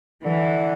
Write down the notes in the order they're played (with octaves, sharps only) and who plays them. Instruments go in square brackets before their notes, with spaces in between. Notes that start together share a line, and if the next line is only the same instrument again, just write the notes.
[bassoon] D3 [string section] E3